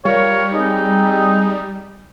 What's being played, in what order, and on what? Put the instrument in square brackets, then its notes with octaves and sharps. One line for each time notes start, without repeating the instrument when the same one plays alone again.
[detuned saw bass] G3 [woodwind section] F4 A#4 C#5
[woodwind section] G#3 C4 D#4